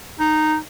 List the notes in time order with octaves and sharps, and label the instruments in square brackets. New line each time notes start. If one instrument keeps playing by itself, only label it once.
[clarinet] D#4